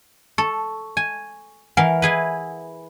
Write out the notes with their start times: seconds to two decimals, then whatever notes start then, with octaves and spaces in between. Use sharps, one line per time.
0.38 A4 C#6
0.97 G#5
1.77 E3 A#4 F5 F#5 G#5
2.02 E4 G#4 B4